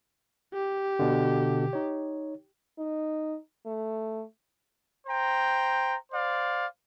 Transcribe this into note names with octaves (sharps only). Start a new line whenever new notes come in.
G4
B2 D3
D#4 C#5
D#4
A3
C5 G5 A#5
C5 D5 F5